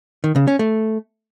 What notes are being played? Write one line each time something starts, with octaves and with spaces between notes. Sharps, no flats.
D#3
C#3
C#4
A3